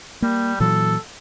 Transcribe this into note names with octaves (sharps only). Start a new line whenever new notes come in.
G3 A#3
A#2 E3 F#3 A4